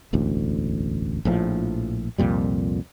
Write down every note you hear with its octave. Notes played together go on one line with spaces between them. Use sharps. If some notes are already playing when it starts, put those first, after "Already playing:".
E1 A1 D2
A#1 A2 F3
C2 F2 A#2 G3